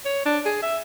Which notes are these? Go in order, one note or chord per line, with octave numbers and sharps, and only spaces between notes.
C#5
D4
G#4
E5